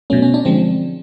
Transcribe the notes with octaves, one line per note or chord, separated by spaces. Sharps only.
B2 F#3 A3 C#4
C#4
D4
D3 F3 G#3 C4